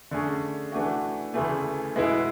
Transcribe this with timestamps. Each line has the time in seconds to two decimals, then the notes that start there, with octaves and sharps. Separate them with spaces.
0.11 D3 A3 C#4 G#4
0.72 E3 A3 D4 F#4
1.34 D2 C#3 E3 A3
1.96 B2 G#3 B3 E4 G#4